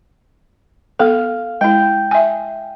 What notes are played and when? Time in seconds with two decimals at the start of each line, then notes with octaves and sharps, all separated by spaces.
0.99 B3 A4 F5
1.61 G#3 E4 G5
2.11 E5 G#5